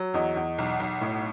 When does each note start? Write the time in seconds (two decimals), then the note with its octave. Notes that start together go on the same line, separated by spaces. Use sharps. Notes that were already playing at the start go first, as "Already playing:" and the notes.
Already playing: F#3
0.14 E2 D#5
0.36 E2
0.58 B1
0.80 B1
1.01 A2